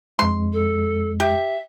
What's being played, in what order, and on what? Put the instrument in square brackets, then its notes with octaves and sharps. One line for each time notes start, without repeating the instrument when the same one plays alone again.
[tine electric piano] F2 G#3 [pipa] C6
[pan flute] A4
[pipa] G4 [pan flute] E5